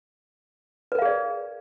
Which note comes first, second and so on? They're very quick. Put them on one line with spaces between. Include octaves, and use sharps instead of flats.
B4 A#4 F5 G#4 D5